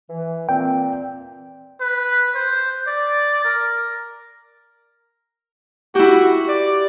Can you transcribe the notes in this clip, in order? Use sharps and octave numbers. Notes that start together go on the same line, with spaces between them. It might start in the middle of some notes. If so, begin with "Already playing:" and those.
E3
A#2 C4 G5
B4
C5
D5
A#4
E4 F#4 G4
D5